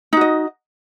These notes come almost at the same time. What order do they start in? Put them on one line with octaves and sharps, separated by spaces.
D#4 F#4 D#5